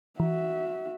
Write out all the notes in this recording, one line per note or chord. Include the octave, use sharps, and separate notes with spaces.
E3 F#4 E5